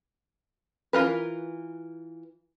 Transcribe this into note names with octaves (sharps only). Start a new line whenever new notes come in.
E3 F4 A#4 B4